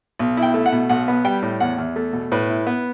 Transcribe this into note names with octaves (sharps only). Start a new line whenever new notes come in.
B1
E4
G5
A3
F#5
B2
B1 F#5
B3
G3 G5
A2
E2 F#5
E2
A3
B2
A2 B4
E4
B3